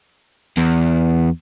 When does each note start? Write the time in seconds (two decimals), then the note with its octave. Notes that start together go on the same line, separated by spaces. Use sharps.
0.57 E2